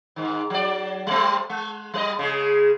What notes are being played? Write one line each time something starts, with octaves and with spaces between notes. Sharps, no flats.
G#2 D#3
F#3 D5
G3 A3 C4
G#3
G3 B4 D#5
C#3 G#3 G#4